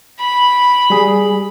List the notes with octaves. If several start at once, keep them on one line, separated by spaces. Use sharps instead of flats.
B5
G3 G#4